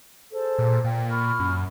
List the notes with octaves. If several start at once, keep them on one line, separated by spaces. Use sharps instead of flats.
G#4 A4 C5
A#2
A#2 G5
B5 C#6 F6
F#2